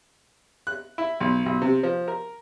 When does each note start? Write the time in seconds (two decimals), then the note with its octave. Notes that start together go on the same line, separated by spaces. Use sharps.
0.67 F#6
0.98 E4
1.20 B1
1.46 B1
1.62 C3
1.83 F3
2.08 A#4